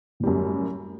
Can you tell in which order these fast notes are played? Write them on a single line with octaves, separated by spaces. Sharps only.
A2 G3 F#2